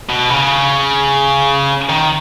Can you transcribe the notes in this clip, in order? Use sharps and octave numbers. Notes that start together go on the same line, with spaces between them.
B2
C#3
D#3